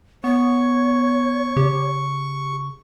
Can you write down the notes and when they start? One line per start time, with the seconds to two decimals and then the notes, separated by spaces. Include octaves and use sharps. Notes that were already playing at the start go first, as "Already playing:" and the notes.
0.24 B3 C#5 C#6
1.57 C#3 G4